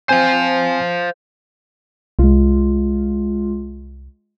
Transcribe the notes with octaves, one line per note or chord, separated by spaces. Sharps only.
C4 C5 F5 G#5
C2 G#3 F4